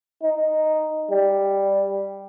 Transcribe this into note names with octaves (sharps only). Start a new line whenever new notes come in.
D#4
G3